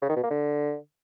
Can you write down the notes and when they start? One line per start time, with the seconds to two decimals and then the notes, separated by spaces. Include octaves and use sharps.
0.02 C#3
0.09 D#3
0.16 B2
0.23 A#3
0.30 D3